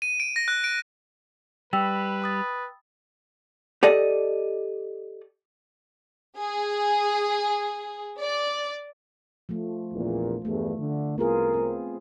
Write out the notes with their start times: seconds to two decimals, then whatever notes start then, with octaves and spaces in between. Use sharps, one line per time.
0.02 D#7
0.20 D7
0.36 A#6
0.48 F#6
0.64 D7
1.73 G3 B4 G5 E6
2.22 B5 D#6 A6
3.83 G4 A4 D5 D#5
6.37 G#4
8.19 D5
9.49 F3 A3
9.94 A#1 E2 A#2
10.45 E2 G2 A3
10.79 D3
11.18 C2 B3 F4 G#4 A#4
11.54 C4